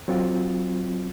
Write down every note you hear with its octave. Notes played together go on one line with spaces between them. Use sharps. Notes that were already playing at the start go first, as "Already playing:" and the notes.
F#3 C4 F4